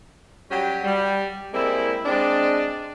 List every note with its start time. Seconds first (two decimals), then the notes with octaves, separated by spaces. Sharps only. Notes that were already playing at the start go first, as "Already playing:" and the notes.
0.51 F#3 G3 C#4 G4
0.84 G3
1.53 G3 G#3 A#3 C4 E4
2.06 G#3 C4 D4